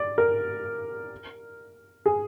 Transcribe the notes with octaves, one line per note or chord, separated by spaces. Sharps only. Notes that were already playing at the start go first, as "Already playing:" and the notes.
Already playing: D5
A#4
G#4